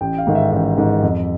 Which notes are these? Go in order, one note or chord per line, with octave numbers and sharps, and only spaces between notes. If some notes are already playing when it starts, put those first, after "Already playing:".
A1 G5
F5
G#2 D#3
E5
A1 E5
G#2 D#3
F2